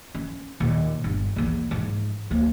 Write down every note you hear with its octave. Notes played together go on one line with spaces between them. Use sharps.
C#4
D#2 A#2
G1
A#1 E2
G#2 F3
D2 A#3